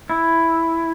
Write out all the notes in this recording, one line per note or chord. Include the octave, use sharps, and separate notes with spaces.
E4